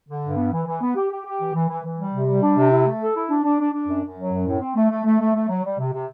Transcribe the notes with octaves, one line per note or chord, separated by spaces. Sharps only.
D3
G2
B3
E3
E3
B3
G4
G4
G4
E3
E3
E3
E3
G3
C3
G3
D4
C3
E4
A3
A4
E4
D4
D4
D4
D4
F#2
F#2
F#3
F#2
A2
C4
A3
A3
A3
A3
A3
F#3
G3
C3
C3